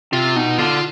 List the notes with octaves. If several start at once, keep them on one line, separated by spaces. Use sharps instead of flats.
C3 F4
B2 D#4
D3 F4